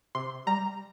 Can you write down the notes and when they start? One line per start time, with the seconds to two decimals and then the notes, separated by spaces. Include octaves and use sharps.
0.15 C3 C6
0.47 G3 A#5